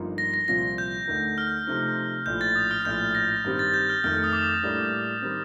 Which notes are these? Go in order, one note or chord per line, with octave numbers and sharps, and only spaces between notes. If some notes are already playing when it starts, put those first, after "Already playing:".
Already playing: G1 G2 F3 A#3 D#4
A#6
A#6
C2 A#2 F3 C4 F4 A#6
G6
D2 D3 A3 D#4 A#4
F6
C3 F3 A3 C4 D#4
A#1 A2 F3 G6
A6
D#6
F6
A#1 A2 F3 G6
A#6
G2 D#3 G3 C4 G4
A6
G6
F6
F2 D#3 A3 F6
D#6
D6
A2 G3 A#3 D4
D#3 G3 C4